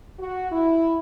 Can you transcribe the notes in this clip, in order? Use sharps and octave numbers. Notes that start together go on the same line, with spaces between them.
F#4
E4